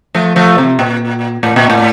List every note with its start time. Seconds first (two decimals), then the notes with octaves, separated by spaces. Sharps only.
0.14 F3 A3
0.36 F3 A3
0.58 C3
0.79 A#2
1.43 A2
1.56 A#2
1.70 A2